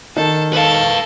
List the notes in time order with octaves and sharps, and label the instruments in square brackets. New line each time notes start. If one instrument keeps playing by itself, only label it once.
[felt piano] D#3 [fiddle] A4
[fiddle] A4 [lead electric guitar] B4 F5